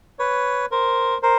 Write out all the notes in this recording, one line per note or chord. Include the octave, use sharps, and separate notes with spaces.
B4 C#5
A#4 C5
A#4 C5